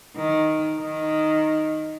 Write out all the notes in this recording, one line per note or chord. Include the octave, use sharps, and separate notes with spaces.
D#3
D#3